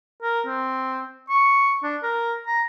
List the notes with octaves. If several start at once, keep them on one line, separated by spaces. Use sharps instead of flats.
A#4
C4
C#6
D4
A#4
A#5